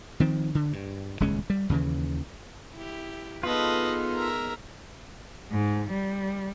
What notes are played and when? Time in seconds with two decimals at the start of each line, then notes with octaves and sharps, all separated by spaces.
0.20 D#3 F3 C4
0.55 D3
0.73 G2
1.20 D#1 C#2 G#3 C#4
1.50 G3
1.69 D#2 C#3 E3
2.75 E4 G4
3.43 B3 D#4 F4 G#4 A4 B4 D#5
4.15 A#4 E5
5.51 G#2
5.92 G3